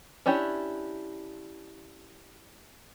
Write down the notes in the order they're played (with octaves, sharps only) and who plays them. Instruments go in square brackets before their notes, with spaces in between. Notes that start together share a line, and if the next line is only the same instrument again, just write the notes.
[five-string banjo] C#4 D4 E4 G4 C#5